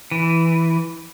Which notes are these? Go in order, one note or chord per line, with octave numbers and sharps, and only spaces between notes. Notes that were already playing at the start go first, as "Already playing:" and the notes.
E3